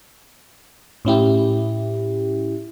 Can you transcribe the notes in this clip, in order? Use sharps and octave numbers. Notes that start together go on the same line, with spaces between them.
A2 C#4 E4 G4